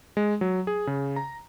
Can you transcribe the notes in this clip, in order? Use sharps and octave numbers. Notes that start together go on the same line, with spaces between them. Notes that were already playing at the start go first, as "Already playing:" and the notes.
G#3
F#3
G#4
C#3
A#5